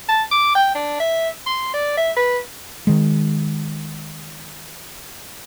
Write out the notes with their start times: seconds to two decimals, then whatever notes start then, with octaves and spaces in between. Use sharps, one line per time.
0.09 A5
0.32 D6
0.55 G5
0.75 D4
1.00 E5
1.46 C6
1.74 D5
1.98 E5
2.16 B4
2.87 D#3 G#3